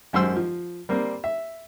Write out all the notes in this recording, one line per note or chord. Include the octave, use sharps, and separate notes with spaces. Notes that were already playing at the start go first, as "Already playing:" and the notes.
G#1 F#2 C5 F#5 C6 E6
F3
G3 A#3 C4
E5